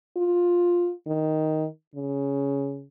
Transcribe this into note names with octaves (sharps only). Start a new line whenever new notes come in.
F4
D#3
C#3